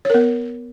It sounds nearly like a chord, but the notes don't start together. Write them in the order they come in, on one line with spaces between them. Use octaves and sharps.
C#5 A#4 B3